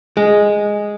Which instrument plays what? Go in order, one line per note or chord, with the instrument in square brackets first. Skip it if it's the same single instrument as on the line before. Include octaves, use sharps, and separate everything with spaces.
[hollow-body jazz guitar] G#3